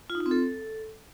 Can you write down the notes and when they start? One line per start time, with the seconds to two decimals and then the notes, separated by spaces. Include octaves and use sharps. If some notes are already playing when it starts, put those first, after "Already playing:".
0.10 F4
0.15 D#4
0.20 F4
0.26 C4
0.31 A4